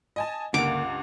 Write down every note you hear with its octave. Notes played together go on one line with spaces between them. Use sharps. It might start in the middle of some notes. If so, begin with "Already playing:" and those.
D#5 G#5 A5
C#2 G2 D3 A#3 F#5 D6